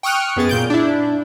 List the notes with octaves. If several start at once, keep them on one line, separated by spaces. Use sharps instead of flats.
G5 C#6 D#6 F6 F#6
F#2 B3 G#4 A6
A#2 G6 D7
D4 E4